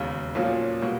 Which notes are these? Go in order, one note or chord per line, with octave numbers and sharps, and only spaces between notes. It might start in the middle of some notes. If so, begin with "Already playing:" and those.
Already playing: E1 D#2 C#3
B1 A#2 F3 A#3 C#4
B2 G3 A#3